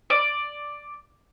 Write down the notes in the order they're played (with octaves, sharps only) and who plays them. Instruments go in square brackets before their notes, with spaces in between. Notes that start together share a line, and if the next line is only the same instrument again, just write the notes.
[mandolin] D5